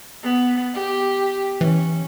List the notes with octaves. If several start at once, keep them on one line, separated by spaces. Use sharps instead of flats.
B3
G4
E3 C#4